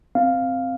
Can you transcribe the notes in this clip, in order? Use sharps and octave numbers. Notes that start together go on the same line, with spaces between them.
C4 F5